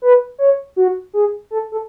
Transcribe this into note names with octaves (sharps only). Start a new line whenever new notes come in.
B4
C#5
F#4
G#4
A4
A4